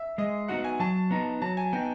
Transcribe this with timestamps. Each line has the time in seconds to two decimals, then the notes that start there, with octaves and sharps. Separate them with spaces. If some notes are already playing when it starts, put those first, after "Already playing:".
Already playing: E5
0.18 G#3 D#5
0.48 B3 D#4 F#4 F#5
0.64 G#5
0.80 F#3 A5
1.11 B3 D#4 A#5
1.42 F#3 A5
1.57 G#5
1.73 B3 D#4 G5